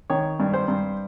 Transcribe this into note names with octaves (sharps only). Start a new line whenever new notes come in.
D#3 C#5
G2
C5
G2